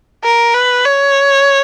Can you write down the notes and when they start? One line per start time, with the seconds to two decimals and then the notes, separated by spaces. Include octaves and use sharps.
0.24 A#4
0.54 B4
0.85 C#5